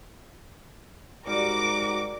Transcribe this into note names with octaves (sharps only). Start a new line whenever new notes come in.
G#2 G3 F#4 A#4 D6